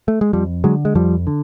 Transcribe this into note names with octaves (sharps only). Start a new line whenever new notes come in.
A3
G#3
F2 F3 G3
D3 F#3 G#3
G#3
F2 F3 G3
D3